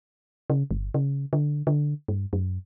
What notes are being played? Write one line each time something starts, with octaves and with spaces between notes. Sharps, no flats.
C#3
G1
C#3
D3
D3
G2
F#2